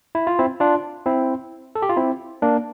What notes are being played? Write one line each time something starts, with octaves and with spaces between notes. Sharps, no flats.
E4
F4
C4 E4
D4 F4
C4 E4
A4
G4
F4
C4 E4
A#3 D4